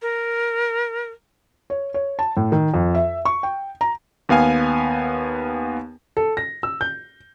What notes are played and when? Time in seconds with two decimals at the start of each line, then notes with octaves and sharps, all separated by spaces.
0.02 A#4
1.70 C#5
1.94 C#5
2.19 A5
2.37 A2
2.52 D#3
2.74 F2
2.95 E5
3.25 C#6
3.43 G5
3.81 A#5
4.29 D#2 B3 F5 G#5
6.17 A4
6.37 A#6
6.63 E6
6.81 G6